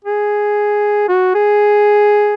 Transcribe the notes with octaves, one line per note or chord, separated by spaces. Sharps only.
G#4
F#4
G#4